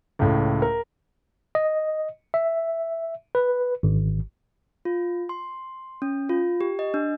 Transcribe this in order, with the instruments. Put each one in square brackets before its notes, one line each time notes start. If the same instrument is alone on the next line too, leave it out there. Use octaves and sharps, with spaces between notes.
[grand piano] C#2 A2
A#4
[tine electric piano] D#5
E5
B4
G#1
[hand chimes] F4
C6
C#4
F4
G4
D#5
D4